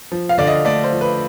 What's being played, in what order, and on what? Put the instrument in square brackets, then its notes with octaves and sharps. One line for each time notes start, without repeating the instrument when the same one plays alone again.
[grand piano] F3
F5
D3 D5
D#5
A3 D5
C5
F3
B4